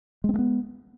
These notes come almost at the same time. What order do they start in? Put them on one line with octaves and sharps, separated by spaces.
G#3 C4 A3 B3